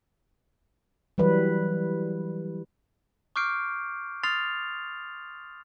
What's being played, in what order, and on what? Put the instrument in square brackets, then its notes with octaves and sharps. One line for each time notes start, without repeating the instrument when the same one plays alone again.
[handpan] E3 F#3 G3 B4
[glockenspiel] C#6 D6 F6 G6 C7 D7
C6 D#6 F6 A6 C7 F7